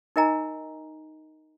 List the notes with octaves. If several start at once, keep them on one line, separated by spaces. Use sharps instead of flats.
D#4 A#4 D#5 G#5 A#5